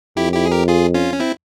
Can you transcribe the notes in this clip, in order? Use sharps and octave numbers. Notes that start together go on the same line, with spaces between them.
F2 E4 G4
E4 G4
G#4
G4 A#4
F4 G#4
C#4 F4
C#4
C4 E4